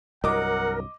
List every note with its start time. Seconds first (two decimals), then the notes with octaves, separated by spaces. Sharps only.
0.24 C2 G2 F#3 A#4 D#5 F#5 D6